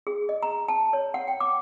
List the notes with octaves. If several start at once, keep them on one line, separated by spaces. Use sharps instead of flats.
G#4
D#5
A#5
A5
C#5
F#5
G5
D6